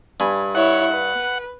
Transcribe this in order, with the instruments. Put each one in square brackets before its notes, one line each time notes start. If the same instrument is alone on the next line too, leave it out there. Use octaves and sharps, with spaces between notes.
[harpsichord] G2 G#5 B5
[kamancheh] E4 C#5 [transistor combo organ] F#5
[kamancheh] B4